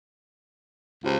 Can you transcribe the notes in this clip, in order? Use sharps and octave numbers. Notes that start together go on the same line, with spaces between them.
C#2 F4 G4 C5